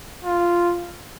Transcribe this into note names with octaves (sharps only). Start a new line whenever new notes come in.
F4